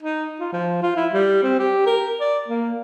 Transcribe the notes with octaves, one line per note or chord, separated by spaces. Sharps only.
D#4
F4
F3
F4
E4
G3
C4
G4
A#4
D5
A#3